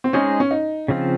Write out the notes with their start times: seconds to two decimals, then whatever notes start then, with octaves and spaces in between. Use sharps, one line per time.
0.04 C4
0.13 G#3 C#4 D#4 G#4 C5
0.40 C#4
0.51 D#4
0.88 C#3 F3 C4 F4